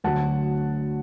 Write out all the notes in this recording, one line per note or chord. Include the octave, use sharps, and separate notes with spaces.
D2 D3 F#3 F#5 A5